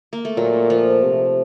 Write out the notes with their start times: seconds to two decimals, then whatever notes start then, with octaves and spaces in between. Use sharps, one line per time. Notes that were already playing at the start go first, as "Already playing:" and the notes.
0.13 A#3
0.25 A3
0.37 A#2 F#3
0.70 F3
1.03 C3